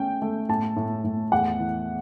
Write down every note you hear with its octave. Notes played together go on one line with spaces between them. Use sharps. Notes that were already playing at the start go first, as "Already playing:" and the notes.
Already playing: A3 C#4 G5
A3
A2 A5
A2
A2
E2 F#5
E3